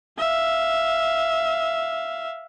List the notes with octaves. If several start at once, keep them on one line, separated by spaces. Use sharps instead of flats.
E5 F5